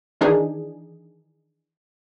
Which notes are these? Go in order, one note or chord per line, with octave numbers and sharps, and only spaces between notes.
D#3 E3 D4 D#4 G#4